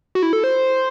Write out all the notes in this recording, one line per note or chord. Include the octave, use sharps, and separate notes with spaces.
F#4
E4
A4
C5